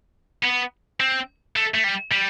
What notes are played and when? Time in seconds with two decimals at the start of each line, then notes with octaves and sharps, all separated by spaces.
0.44 B3
1.00 C4
1.56 A3
1.74 A3
1.84 G3
2.12 G3